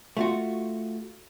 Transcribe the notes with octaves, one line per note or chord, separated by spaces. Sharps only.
A3 F4 F#4